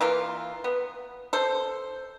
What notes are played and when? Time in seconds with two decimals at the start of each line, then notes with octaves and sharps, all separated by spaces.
0.01 E3 A#3 F4
0.64 B3
1.33 A4 C5